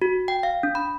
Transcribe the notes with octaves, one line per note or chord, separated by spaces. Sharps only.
F#4
G5
F5
D4
B5